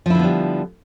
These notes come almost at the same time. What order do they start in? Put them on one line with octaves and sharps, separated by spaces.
F3 E4 D3 B3 G3